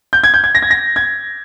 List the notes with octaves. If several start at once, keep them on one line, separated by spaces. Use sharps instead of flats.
G6
G#6
G6
G#6
A#6
G#6
A#6
G#6